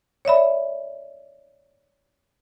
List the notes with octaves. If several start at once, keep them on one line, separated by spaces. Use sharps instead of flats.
C#5 D5 E5 B5